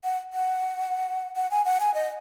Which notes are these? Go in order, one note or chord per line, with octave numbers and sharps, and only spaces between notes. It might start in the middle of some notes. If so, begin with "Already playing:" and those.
F#5
F#5
F#5
G#5
F#5
G#5
D#5